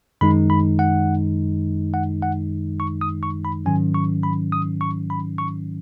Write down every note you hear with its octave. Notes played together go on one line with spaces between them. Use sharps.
F#2 D#3 G#3 D#4 B5
B5
F#5
F#5
F#5
C#6
D#6
C#6
B5
G#2 D#3 F#3 C#4 G#5
C#6
B5
D#6
C#6
B5
C#6